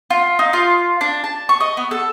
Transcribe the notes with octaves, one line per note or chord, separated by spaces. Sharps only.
F4
D#4
F4
D4
A5
C#6
D#5
B3
A4